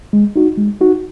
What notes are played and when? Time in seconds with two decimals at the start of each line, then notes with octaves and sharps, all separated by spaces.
0.13 G#3
0.36 D#4 F#4
0.58 G#3
0.81 D#4 F#4